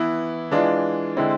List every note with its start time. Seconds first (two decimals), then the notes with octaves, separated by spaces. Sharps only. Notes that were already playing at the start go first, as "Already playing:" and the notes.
Already playing: E3 B3 E4
0.51 E3 G#3 D4 F4
1.17 D3 G#3 C4 E4